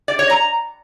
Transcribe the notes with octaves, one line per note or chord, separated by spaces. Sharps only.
D5
C#5
A#5